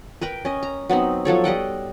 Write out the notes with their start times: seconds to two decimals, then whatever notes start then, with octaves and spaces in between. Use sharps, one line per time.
0.21 A#4 B4 G5
0.45 C#4 D#5
0.63 A#5
0.90 F#3 B3 C4 D#4
1.25 F3 F#3 A4 C#5
1.44 G3 D#5 F#5 G5